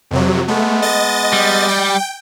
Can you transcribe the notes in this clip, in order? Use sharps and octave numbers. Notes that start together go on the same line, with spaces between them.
F2 C3 F#3
G#3 A3 B3
D#5 A6
G3
G5